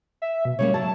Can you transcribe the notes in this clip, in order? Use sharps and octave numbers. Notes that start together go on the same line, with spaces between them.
E5
B2
C#3 G3 A#3 C#5
F#3 E5 A5